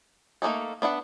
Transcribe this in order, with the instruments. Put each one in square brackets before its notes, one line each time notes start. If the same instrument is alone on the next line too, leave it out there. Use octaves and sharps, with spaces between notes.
[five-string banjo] A3 A#3 D4 D#4 A4
B3 D4 E5 F#5